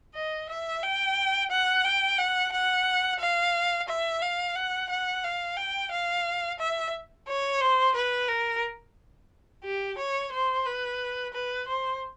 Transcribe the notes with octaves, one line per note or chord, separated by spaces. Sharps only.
D#5
E5
G5
F#5
G5
F#5
F#5
F5
E5
F5
F#5
F#5
F5
G5
F5
E5
C#5
C5
B4
A#4
G4
C#5
C5
B4
B4
C5